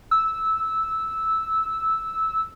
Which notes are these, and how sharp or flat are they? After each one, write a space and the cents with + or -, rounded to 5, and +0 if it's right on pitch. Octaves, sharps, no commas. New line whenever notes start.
E6 -10